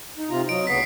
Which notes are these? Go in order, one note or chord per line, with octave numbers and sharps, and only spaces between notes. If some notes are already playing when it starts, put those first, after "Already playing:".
D#4
C3 F4 A#5
F#3 D#5 D7
D2 C#3 B3 B6 C7